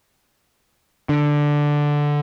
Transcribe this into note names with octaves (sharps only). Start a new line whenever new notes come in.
D3